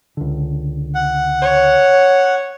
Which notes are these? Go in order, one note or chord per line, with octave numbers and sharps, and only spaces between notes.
C#2 D3
F#5
C#5